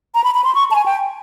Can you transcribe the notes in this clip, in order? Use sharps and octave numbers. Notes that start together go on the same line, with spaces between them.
A#5
B5
B5
C6
C#6
A5
G#5
G5